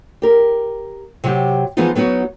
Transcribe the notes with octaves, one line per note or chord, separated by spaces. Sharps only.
G4 A#4
C3 F#3 G4
E3 F3 G#3 B3 D#4 F4
F#3 B3 D#4 F#4